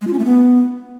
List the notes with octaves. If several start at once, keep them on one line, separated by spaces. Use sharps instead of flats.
G#3
F4
C#4
A3
B3